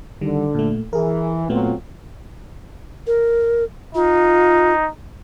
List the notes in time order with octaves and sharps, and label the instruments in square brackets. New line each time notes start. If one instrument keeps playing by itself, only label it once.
[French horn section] D3 [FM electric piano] D#3 G3
[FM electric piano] A#2 A3
[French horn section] E3 [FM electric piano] G#4 A#4
[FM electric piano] A#2 A3 B3 [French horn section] F#3 C4 F4
[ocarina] A#4
[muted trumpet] D#4 [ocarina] F4